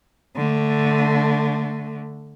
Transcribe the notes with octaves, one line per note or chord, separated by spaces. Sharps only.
D3 A3